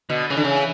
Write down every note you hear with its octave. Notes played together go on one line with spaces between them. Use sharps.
B2 D3
C#3 E3
D3
C#3